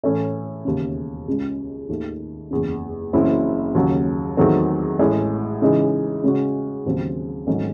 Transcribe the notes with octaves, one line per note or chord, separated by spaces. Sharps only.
A2 E3 A3 C#4
E1 D#2 C#3
C#2 C#3 G#3
D#2 D#3 A3
F#1 E2 C#3
F#1 F#2 E3 C4 E4
D#2 C#3 F#3
E2 D#3 F#3 A3 C4
A1 A2 G#3
C#3 E3 G#3 D#4 G#4
C#3 G#3 C#4 F#4
D#2 C#3 F#3 C4
G#1 G#2 F#3 A3 C#4